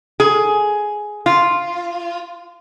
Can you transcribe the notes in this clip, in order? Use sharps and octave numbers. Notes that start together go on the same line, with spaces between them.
G#4
F4